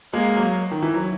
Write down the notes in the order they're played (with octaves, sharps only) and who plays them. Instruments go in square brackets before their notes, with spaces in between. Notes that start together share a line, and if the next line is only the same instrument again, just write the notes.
[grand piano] G#3 [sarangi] A#3
[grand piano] F#3
D#3
E3
F#3